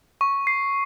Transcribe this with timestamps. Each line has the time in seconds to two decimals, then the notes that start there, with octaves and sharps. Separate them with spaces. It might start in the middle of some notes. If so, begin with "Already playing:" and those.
0.21 C#6
0.47 C7